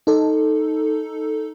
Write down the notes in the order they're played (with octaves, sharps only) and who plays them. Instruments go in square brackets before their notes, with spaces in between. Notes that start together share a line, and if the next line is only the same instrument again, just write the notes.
[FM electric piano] D#4 A4